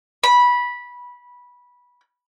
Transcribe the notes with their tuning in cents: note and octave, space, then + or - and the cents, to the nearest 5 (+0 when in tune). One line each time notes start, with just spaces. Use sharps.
B5 -15